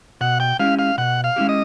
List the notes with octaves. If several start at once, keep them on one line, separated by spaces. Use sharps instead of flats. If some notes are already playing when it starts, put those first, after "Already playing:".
B2 F#5
G5
G#3 C#4 E4 G4 F5
F5
B2 F#5
F5
G#3 C#4 E4 G4
D#5